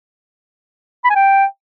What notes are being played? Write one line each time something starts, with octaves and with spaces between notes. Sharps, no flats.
B5
G#5
G5